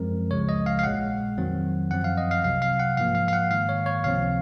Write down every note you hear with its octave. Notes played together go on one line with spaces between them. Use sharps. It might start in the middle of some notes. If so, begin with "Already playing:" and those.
Already playing: F#2 F3 G#3 C4 A#4
C#2 C#3 F3 G#3 C#5
D#5
F5
F5
A#1 A#2 G#3 F#5
F2 D#3 F#3 C4
F#2 F3 C4 F#5
F5
D#5
F5
C2 C3 F#3 F5
F5
F#5
G#2 F3 A#3 F5
F5
F5
F#5
G#2 D#3 A#3 F5
C#5
C#5
C#2 C3 F3 C4 F5